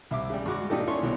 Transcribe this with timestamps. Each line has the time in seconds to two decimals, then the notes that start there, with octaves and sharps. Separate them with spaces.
0.11 C2 E5 D6
0.30 C#3 G3
0.46 G2 G#3 F#4 D6
0.70 A#2 D4 D#4 G4 A4
0.87 C#4 D4 E4 A4 C6 C#6
1.03 C2 B2 C#5